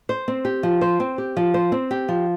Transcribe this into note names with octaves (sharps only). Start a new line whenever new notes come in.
C5
C4
G4
F3
C5
C4
G4
F3
C5
C4
G4
F3